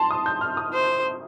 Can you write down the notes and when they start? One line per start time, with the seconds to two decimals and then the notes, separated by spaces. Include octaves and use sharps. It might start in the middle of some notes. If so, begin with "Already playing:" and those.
Already playing: A5 C6
0.11 D#6
0.26 G6
0.41 F6
0.57 D#6
0.74 C5